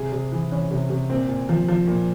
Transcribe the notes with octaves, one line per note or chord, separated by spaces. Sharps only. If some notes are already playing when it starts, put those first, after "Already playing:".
Already playing: C3 G#4
C3
E3
E3 C#4
C3
C3
A#2 C4
A#2
F3
F3
A#2